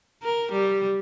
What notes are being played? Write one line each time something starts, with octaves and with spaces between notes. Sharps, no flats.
A#4
G3